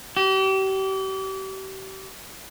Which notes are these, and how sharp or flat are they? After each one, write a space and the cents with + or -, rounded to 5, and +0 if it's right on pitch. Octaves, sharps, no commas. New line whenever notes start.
G4 -35